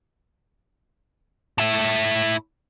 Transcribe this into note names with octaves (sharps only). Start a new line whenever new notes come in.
A2 E4